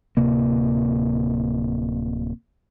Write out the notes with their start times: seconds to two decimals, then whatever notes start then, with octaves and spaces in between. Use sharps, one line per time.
0.17 D1 C3 A#3